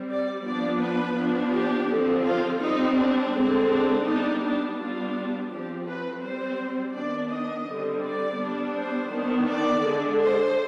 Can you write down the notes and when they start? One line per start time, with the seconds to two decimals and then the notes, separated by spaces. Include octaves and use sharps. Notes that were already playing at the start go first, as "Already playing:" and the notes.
Already playing: G3 C4
0.09 D5
0.45 F3 B3 D4 D5
0.81 B4
1.17 F3 B3 D4
1.53 G4
1.89 D3 F3 C4
2.26 F4
2.62 G3 C4 D#4
2.98 D4
3.33 D3 G#3 C4
3.71 D4
4.06 G3 B3 D4 D#4
4.42 D4
4.78 G3 B3 D4 F4
5.51 F3 C4 G4
5.87 B4
6.23 G3 C4 C5
6.95 D#3 B3 D4 D5
7.31 D#5
7.67 D3 G3 C4
8.04 D5
8.40 G3 B3 D4
8.76 C5
9.12 D#3 B3 D4
9.48 D5
9.84 D3 G#3 D4
10.20 C5